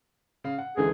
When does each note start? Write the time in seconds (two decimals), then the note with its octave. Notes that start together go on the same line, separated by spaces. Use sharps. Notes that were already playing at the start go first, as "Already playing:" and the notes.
0.44 C#3 F5
0.58 F#5
0.77 C#2 D3 E3 G#4